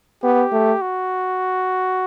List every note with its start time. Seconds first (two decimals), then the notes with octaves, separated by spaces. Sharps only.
0.23 B3 G4
0.52 A3
0.82 F#4